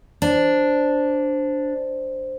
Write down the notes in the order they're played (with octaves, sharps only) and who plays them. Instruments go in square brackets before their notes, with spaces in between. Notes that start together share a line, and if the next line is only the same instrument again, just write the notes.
[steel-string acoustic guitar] D4 [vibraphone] C5